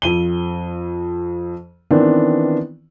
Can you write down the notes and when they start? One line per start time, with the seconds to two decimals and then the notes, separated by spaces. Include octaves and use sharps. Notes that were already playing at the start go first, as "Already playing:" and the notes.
0.02 F2 D#7 G7
1.91 D#3 E3 B3 C4 D4